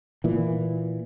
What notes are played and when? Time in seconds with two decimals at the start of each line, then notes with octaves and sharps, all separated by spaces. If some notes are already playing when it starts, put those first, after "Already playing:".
0.24 A#2 E3